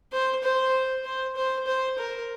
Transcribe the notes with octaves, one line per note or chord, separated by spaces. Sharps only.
C5
C5
C5
C5
C5
A#4